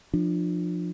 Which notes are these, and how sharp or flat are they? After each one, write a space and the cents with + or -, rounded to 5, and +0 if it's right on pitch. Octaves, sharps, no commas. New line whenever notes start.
F3 +10 D4 +35